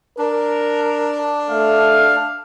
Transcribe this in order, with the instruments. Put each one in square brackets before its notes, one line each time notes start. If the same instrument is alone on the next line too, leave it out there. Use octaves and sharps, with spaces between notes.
[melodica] D4 [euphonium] A#4
[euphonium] A3 [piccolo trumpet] F5